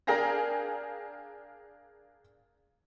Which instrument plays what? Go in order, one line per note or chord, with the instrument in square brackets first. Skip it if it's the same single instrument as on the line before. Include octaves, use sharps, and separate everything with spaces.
[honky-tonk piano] D4 G#4 A#4 F5 G5 A#6